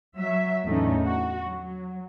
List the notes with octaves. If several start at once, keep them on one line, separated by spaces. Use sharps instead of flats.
F#3 E5
E2 A2 D3 A3 C#4 D#4
F#4
F#3